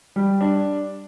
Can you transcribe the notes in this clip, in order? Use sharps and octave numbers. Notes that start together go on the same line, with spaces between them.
G3
D4